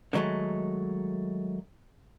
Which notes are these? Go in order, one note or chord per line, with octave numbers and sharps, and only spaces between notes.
D3 D#3 F#3 G#3 A3